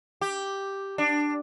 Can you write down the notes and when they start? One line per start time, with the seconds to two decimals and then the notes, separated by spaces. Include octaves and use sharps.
0.21 G4
0.98 D4